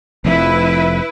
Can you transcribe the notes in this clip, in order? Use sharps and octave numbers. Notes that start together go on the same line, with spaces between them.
F1 F2 E4 B4